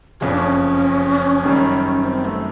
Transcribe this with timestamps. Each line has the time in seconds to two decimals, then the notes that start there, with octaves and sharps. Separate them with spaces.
0.21 F#1 F2 C#3 C#4
0.31 D4
0.39 C#4
1.44 F#2 D#3 G3
2.04 C4
2.25 A3